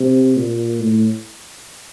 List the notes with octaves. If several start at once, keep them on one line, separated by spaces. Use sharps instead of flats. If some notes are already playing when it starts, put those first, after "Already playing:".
Already playing: C3
A#2
A2